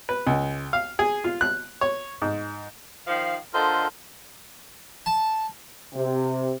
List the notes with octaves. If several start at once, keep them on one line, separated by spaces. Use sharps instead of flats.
B4
C#2
F5
G#4
F4
F#6
C#5
G#2
D#3 F3 F5
D3 F4 A4 A#4 C5 D#5
A5
C3